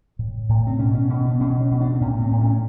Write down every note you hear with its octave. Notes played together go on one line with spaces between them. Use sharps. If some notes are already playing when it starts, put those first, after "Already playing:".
A2
A2
C4
B2 C#4
C#4
B2 C#4
B3
B2 C#4
C#4
B2
D4
C4
A2 C#4
C4
A2
C#4